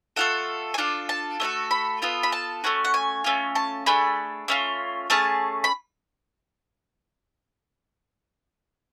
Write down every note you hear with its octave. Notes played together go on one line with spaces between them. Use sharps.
A3 F4 A4 F#5
G#5
D4 F4 A4 A5
A5
A3 D4 F#4 A4
B5
B3 F4 A4
B5
A5
A3 C#4 F#4
F#5
G#5
A3 C#4 F4
A5
A3 D4 G#4 B5
A3 C#4 F4
A3 C#4 G#4 A5
B5